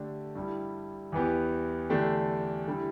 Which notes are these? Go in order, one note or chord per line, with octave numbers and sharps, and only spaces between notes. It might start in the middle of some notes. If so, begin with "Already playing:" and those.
Already playing: D3 A3 D4 G4
G2 G3 E4
E2 E3 B3 G4
E2 D3 A3 D4 G4
D3 G3 E4